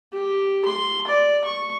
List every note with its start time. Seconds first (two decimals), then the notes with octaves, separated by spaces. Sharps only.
0.13 G4
0.65 C6
1.07 D5
1.44 C#6